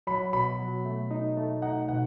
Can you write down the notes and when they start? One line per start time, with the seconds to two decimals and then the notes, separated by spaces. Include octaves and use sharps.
0.07 F#3 B5
0.33 B2 B5
0.59 F#3
0.85 A3
1.11 D#4
1.37 A3
1.62 D#4 F#5
1.88 B2 F#5